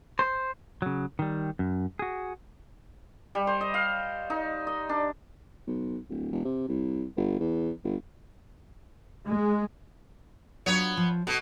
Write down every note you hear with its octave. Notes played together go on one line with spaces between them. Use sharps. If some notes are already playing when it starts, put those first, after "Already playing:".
C5
C#3 F#3
D#3 G3
F#2
F#4 G#4
G3
C5
D#5
F5
D#4
D#5
D4
B1
D1
E1
C3
C2
G1
E2
G1
G#3
F#3 B3 D4 F4 C#5
F3
B2 A4